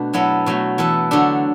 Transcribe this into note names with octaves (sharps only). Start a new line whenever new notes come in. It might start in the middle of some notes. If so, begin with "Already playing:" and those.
Already playing: B2 A3 D4 F#4
F#3 B3 E4 A4
B2 F#3 A3
E3 B3 E4 A4
D3 F#3 A3 D4 A4